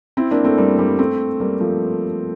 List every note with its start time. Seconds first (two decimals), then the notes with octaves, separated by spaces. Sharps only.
0.17 C4 E4
0.31 A#3 D4
0.44 A3 C4
0.58 G3 A#3
0.78 G3 A#3
0.99 A3 C4
1.40 G3 A#3
1.60 F3 A3